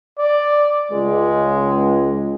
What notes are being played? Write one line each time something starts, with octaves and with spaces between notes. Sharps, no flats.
D5
C#2 G#3